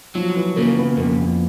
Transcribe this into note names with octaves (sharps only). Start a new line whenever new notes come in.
F3 F#3
E3
C#3 A#3
B3
F2 A#3